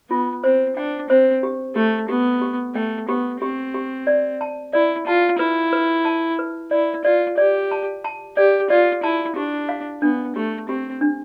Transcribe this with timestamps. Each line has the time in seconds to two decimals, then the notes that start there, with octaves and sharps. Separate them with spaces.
0.10 B3 F4
0.44 C4 C5
0.76 D4 G5
1.10 C4 C5
1.43 G4
1.75 A3 G4
2.09 B3 G4
2.42 G4
2.75 A3 G5
3.08 B3 G4
3.41 C4 G4
3.74 G4
4.07 D5
4.41 A5
4.73 E4 D5
5.06 F4 A5
5.39 E4 B4
5.73 B4
6.05 A5
6.39 B4
6.71 E4 D5
7.04 F4 D5
7.37 G4 D5
7.71 A5
8.04 A5
8.37 G4 D5
8.70 F4 D5
9.03 E4 A5
9.36 D4 G4
9.69 F5
10.02 B3 D4
10.35 A3 G4
10.69 C4 G4
11.01 D4